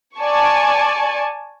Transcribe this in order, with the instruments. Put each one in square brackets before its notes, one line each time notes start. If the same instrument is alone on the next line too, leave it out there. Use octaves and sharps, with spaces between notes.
[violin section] D5 G#5 A5 C#6